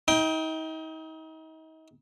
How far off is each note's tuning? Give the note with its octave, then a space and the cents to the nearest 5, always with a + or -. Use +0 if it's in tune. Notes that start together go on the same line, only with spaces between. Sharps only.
D#4 +35 G5 +0